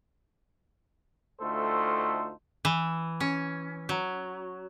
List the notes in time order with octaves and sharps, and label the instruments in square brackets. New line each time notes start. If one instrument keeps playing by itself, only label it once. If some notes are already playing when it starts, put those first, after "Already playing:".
[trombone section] D2 A3 D#4 F4 A4 C5
[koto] E3
C#4
F#3